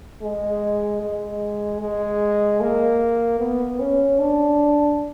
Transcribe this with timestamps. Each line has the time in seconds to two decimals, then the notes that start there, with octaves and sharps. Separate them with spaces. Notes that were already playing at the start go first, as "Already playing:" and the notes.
0.22 G#3
1.02 G#3
1.81 G#3
2.60 A#3
3.40 B3
3.80 C#4
4.19 D4